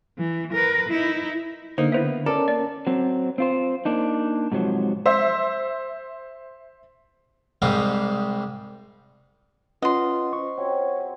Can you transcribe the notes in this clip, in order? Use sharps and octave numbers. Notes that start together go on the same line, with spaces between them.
E3
A#4 B4
D#4 E4
D3 A#3 D#4 C5
B3 E4 C5 E5
C#4 A4 A#4 D5
A#3 D5
F#3 C4
C4 F4 C5
A#3 D4 D#4
G#2 C3 F3 F#3
C5 E5
C2 G#2 C3 G3 D#4 F5
C#4 F4 B4 D#5 F#5 C6
C5 C#6
F#3 C4 G#4 C#5